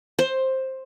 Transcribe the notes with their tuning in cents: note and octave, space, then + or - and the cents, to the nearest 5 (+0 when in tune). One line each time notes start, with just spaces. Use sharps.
C5 +10